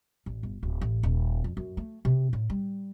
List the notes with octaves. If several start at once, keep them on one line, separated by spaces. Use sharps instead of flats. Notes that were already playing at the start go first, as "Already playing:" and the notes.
A1
G1
D1
A1
D#1
F2
F#2
A3
C3
A2
G3